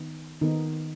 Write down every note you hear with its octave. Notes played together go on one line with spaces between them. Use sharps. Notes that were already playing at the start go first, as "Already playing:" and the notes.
Already playing: D#3 B3 D#4
D#3 B3 D#4